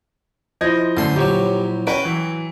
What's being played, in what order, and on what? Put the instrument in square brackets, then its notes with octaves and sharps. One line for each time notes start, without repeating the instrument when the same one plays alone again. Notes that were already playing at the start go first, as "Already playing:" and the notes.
[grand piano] F3 D#5 G#6 [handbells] E4 C5
[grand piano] F#2 A3 [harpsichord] D3 C6
[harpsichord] A#1 F#3 [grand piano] G4 C#5
[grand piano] C#4 B4 C#6 [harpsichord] F#4 G5 [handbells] D7
[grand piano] E3 F#3